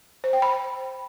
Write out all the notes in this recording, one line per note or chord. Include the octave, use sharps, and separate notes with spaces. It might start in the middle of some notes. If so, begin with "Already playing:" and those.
C5
G5
B5